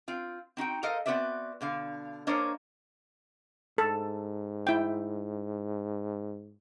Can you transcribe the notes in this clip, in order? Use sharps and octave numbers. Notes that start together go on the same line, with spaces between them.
C4 F4
C4 D#4 F#4 G5
A4 A#4 C5 D#5 F5
B3 C4 F#4 B4 D5 E5
B2 D3 F5
A#3 D4 A#4 C5 C#5 D#5
G#2 A4
E4 G5